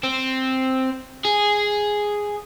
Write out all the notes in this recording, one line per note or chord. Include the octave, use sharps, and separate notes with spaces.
C4
G#4